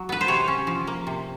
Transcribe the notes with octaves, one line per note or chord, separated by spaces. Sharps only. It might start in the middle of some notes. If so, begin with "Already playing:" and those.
Already playing: F#3
B3 B4
C5
C3 C#5
C#4
F3
A#3
C3